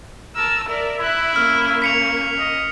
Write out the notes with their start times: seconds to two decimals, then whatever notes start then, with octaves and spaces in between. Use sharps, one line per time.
0.36 A#4 A5 E6
0.69 A#4 D5 E5
0.99 E4 E5 F#6
1.36 A#3 C#4 F6
1.82 B6 C#7 F7
2.39 D#5